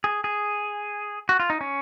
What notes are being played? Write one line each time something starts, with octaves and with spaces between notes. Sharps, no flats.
G#4
G#4
F#4
F4
D#4
C#4